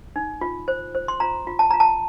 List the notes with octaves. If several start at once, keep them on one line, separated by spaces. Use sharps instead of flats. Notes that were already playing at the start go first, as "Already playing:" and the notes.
D#4
F4
C5
C5
C6
F4 A#5
F4
A5
F4 A#5
A5